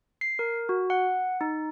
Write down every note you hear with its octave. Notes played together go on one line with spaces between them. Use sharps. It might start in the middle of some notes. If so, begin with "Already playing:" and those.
C7
A#4
F#4
F#5
D#4